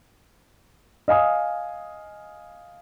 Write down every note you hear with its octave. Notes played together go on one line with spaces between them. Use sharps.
D#5 F5 G#5 D#6